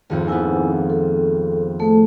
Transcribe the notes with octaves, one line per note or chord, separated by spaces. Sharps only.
G#1 F2
A#3 B3 E4 G#5
A4
A3 A4